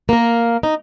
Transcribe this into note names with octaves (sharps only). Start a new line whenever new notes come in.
A#3 A#4
D#4